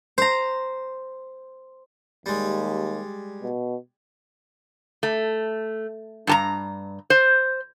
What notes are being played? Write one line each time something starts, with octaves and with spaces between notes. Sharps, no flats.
C5 A#5
D#2 G3 G#3
B2
A3
G2 A5 A#5
C5